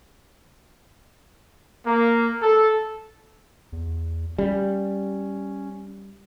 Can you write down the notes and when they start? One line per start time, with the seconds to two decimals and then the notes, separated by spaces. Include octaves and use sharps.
1.86 A#3
2.42 A4
3.72 E2
4.38 G3 C#4